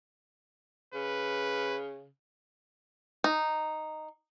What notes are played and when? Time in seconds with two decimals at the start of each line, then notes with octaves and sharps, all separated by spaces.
0.94 C#3 B4
3.24 D#4